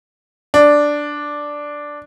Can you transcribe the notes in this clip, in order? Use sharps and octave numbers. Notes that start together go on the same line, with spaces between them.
D4